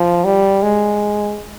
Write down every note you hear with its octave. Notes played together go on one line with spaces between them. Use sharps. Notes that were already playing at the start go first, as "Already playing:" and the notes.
Already playing: F3
G3
G#3